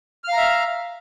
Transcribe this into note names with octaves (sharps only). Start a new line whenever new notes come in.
E5 F5 A#5 F6